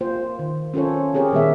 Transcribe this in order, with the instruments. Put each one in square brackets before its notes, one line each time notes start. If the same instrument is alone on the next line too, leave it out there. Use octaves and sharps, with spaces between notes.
[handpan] A#3 F4 C5
D#3
C#4 F4 A4 C5 C#5
C4 G4 G#4 A#4 C#5
A#2 D#3 G3 B3 B4 E5